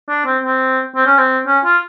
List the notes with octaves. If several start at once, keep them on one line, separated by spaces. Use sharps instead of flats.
D4
C4
C4
C4
C#4
C4
C#4
F4